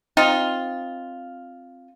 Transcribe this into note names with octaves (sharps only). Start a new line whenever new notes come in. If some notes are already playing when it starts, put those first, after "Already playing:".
C4 D#4 F4